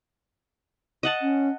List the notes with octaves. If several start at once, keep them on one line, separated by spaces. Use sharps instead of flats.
D#5 F#5 A5
C#4